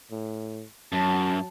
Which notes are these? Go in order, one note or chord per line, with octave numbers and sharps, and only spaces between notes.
A2
F#2 F#3 A5